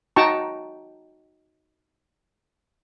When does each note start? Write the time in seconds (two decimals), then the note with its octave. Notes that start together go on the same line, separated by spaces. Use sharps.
0.16 D#4 F#4 G5 A5 A#5 C#6